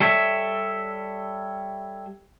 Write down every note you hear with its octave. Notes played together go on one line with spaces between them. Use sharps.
G3 A4 C#5 E5